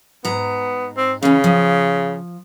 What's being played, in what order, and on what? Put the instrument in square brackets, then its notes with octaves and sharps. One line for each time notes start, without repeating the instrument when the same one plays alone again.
[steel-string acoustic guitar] G#2 A#5 [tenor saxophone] B3
[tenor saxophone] C4
[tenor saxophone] C#3 [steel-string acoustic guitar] E3 C#4
[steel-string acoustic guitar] F3